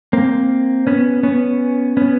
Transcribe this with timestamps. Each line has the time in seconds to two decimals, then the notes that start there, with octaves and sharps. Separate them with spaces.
0.13 A#3 C4
0.87 B3 C#4
1.23 B3 C#4
1.97 B3 C#4